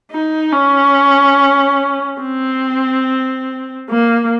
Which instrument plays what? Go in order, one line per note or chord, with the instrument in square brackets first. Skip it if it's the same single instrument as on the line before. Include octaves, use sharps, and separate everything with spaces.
[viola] D#4
C#4
C4
A#3